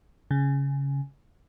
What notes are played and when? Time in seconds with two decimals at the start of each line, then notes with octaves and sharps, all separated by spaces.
0.31 C#3